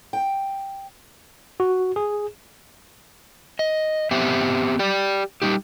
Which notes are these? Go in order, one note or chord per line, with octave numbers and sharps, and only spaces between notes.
G5
F#4
G#4
D#5
B3 C4 G4 C5 E5 F#5
G4 D5
G3 D#4 G4